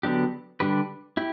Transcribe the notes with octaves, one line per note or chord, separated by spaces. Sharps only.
D3 F#3 B3 D4 G4
D3 G3 D4 G4 B4
E4 G4